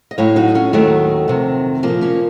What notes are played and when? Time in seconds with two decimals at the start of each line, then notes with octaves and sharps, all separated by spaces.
0.11 D#5
0.18 A2 F#3 C#5 F5
0.36 D#4 F#4
0.54 C#4 F4
0.73 D#2 D#3 F#3 A3
1.28 F2 C3 D#3
1.83 A#2 F3 A#3
2.01 A#3 C#4